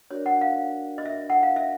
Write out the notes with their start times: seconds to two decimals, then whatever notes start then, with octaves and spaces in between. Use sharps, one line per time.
0.11 D4 F#4 A#4 C#5 D5
0.26 F#5
0.41 F5
0.98 D#5
1.05 E5
1.30 F#5
1.43 F5
1.56 E5